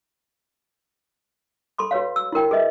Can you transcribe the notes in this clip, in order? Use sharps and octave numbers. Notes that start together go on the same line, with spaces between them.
A4 B5 C6 D6
F#4 B4 C#5 F5
E6
E4 F#4 A#4 G5
G#4 B4 D#5 E5